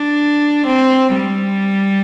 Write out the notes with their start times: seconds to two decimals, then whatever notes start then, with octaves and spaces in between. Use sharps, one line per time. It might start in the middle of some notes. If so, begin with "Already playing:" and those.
Already playing: D4
0.66 C4
1.15 G3